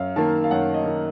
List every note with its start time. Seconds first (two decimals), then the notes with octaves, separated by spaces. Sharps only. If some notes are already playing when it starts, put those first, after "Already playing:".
Already playing: F#2 F5
0.16 D#3 A#3 A5
0.44 F5
0.51 F#2 F#5
0.74 D#5
0.85 D#3 A#3